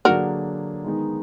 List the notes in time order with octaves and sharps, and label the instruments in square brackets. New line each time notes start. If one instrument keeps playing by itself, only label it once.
[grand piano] D3 F#3 A#3 D4 G#4 [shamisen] F#4 A#4
[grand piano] D#3 G#3 B3 D#4